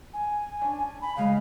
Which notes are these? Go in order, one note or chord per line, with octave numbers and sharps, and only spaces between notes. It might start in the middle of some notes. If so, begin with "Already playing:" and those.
G#5
C#4 D4
B5
C#3 G#3 D#5 F5